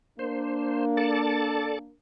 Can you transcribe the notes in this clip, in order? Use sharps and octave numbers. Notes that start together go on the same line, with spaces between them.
A#3 D4 C5
A4 D5 A5